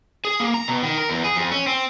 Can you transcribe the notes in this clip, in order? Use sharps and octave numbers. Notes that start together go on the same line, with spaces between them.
G#4
A#3
A#5
B2
D#3
A#4
E2
G#4
F2
C#4
C4